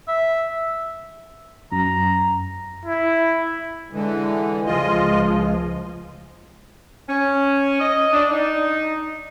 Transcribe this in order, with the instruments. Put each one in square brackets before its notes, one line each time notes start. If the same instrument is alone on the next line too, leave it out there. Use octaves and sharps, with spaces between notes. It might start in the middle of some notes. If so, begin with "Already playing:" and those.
[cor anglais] E5
[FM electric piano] F#2 [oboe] A#5
[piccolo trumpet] E4
[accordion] D3 E3 [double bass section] G#3
[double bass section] C#2 F3 G#3 [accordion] F4 D#5
[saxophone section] C#4
D#5
D4
D#4